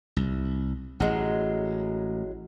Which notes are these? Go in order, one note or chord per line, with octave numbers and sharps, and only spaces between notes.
C2
A1 F#3 G#3